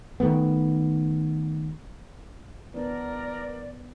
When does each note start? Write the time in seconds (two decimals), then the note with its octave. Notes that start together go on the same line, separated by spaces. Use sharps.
0.20 D#3 E3 A3 B3
2.74 E3 B3 D4 A#4 D5